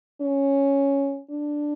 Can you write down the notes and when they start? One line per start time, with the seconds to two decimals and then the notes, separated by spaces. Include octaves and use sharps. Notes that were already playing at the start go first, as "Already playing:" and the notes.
0.21 C#4
1.31 D4